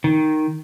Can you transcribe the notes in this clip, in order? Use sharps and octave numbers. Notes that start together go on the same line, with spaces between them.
D#3